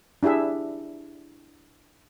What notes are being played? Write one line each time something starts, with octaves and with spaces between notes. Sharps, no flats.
D4 E4 G4 G#4 E5